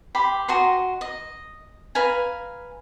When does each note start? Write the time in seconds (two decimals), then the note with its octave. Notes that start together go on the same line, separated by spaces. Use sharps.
0.15 G4 B5 C6
0.48 F#4 D#5 A#5 C6
1.01 D#5
1.95 B4 F5 G#5 A#5